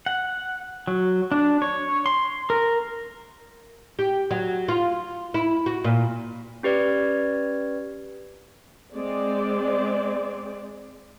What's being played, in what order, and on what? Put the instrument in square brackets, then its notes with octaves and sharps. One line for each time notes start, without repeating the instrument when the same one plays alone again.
[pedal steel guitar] F#5
F#3
D4
C#5
C6
A#4
[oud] G4
F#3
F4
E4
F#4
A#2
[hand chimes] C#4 G4 B4 D5 G#6
[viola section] G#3 C4 D5